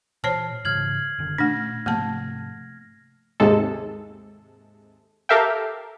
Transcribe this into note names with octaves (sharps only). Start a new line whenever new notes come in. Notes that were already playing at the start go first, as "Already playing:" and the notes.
A#2 E3 C5 C#5 A5 F6 C7
G#2 C#3 E3 F6 G#6 F#7
F#1 D3 D#3
A#2 A3 C#4 D4 A#6
G#2 C3 F3 A3 A#3 A5
D#2 G#2 C3 G#3 A4
G4 A4 A#4 E5 F5 G5